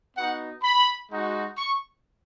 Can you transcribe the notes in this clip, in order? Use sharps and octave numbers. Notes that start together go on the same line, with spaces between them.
B3 D#4 F#4 F#5
B5
G#3 D#4 F#4
C#6